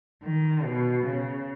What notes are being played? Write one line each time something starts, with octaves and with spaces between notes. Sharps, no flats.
D#3
B2
C#3